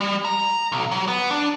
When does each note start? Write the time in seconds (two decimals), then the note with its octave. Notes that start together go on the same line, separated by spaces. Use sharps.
0.01 G3
0.25 A#5
0.72 B1
0.91 F#3
1.08 B3
1.31 D4